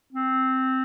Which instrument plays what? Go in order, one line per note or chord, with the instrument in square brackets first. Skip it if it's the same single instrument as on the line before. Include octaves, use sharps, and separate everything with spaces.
[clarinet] C4